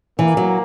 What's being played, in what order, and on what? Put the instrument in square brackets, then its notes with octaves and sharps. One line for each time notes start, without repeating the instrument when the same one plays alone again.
[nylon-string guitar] E3 [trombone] A#3
[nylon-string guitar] F#3